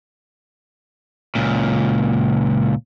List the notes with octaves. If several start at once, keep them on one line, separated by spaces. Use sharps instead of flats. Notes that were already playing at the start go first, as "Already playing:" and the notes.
C#2 A#2